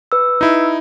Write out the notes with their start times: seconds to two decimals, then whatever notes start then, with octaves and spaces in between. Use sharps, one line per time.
0.12 B4 E6
0.41 D#4 E4